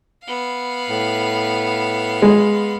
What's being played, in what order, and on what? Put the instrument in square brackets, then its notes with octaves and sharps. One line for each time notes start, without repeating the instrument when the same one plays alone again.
[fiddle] B3 F5
[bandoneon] A2
[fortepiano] G#3